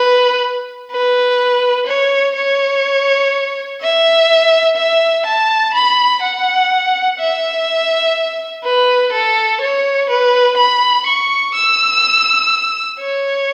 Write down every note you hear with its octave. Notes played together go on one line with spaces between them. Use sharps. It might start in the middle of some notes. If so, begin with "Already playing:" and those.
Already playing: B4
B4
C#5
C#5
E5
E5
A5
B5
F#5
E5
B4
A4
C#5
B4
B5
C#6
E6
C#5